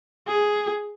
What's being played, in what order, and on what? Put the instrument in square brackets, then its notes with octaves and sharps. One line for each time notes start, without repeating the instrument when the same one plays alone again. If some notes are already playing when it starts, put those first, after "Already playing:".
[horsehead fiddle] G#4